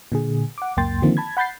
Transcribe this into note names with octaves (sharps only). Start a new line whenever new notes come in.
A#2 D3 G#4
F#5 D6
C#2 F#2 A#3 G5 C6 A6
D3 D#3 F3 A#3 C4
A5 B5 G#6
F#5 B5 G6 A6 C7